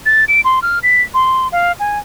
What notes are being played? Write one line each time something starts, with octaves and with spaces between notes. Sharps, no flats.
A6
D7
C6
F6
B6
C6
F5
G#5